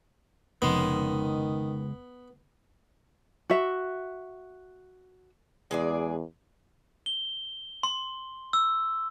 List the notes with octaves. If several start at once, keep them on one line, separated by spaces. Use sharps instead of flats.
F1 C#2 C3 D#3 F3 B3 D#5 C6
F#4 E5
E2 G#3 G#4 D5
G7
C6
E6